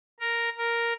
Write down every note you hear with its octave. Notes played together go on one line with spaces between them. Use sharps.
A#4
A#4